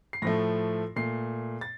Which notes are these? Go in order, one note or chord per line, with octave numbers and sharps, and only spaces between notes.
C7
A2 F3 A3 A#6
A#2 A3 C7
A6